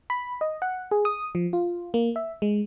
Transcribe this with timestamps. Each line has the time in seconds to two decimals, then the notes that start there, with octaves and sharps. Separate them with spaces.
0.10 B5
0.41 D#5
0.62 F#5
0.91 G#4
1.05 D#6
1.35 F3
1.53 F4
1.94 A#3
2.16 E5
2.42 G#3